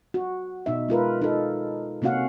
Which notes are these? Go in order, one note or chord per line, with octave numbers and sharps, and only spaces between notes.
F#4
B2 D#4 E5
G#3 F4 A#4 B4
D#4 A4
C3 A#3 C#4 F#4 F5 F#5